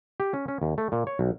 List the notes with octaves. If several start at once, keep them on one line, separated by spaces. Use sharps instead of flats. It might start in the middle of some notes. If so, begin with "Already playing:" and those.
G4
C#4
C#4
D#2
A3
A#2
C#5
B1